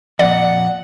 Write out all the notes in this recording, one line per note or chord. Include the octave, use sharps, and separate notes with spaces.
F2 A#2 D5 F#5